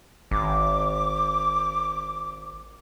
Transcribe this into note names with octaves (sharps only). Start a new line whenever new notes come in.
G#1 D6